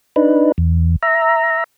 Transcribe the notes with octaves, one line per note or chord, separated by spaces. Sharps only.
D4 D#4 B4
E2
E5 A#5